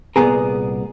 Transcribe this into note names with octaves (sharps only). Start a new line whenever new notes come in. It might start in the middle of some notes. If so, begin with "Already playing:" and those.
C2 A#2 B3 G#4 A#4